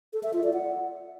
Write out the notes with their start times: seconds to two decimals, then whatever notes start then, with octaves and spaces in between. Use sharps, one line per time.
0.13 A4
0.23 E5
0.33 F4
0.43 D5
0.53 F#5